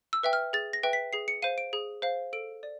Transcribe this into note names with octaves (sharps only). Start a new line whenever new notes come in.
E6
B4 E5 G5
F6
G#4 A6
A#6
B4 E5 G5
B6
G#4 C7
C#7
C5 F5 D#7
D7
G#4
C5 F5
A4 D7
D5